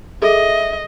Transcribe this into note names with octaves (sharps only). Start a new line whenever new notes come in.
G#4 A4 D#5 E5